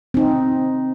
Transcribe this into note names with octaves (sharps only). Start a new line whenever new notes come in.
C4 D#4